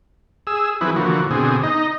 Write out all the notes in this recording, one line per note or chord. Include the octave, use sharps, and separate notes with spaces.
G#4 E6
E3 F#3 C4 E4 G#4 B4
D3 E3 F3 A#3 F#4
B2 D3 C4 G#4
D#4 D#5